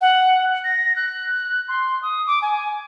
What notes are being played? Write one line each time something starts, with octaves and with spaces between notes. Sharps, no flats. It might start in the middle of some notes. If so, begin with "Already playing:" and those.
F#5
A#6
F#6
C6
D#6
D6
G#5